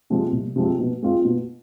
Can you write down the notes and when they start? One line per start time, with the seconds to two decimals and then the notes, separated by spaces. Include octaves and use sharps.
0.10 C3 F3 G#3 C4
0.32 C2
0.56 C3 F3 G#3 C4
0.79 B2
1.02 G#3 C4 F4
1.25 B2